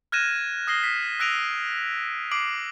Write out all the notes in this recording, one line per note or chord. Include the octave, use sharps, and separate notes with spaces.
F6 F#6 G#6 A#6 D#7 E7
D#6 A#6 C7 G7
B6
E6 F#6 A#6 D7 D#7 F7
D6 C7 D7 F#7